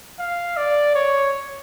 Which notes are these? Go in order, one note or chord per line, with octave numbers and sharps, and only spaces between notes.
F5
D5
C#5